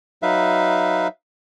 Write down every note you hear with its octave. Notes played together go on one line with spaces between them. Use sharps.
F#3 D#4 B4 E5 F5